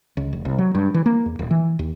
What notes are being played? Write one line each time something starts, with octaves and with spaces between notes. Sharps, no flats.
C#2
F1
C2
F#3
G2
E3
A#3
E2
D#1
E3
D#2